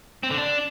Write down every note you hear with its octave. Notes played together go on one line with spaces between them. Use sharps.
C4
D3
D4